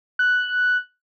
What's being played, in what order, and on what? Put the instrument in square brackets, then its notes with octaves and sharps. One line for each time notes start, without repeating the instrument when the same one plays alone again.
[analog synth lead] F#6